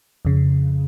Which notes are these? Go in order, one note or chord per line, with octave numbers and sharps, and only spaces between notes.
F2 C#3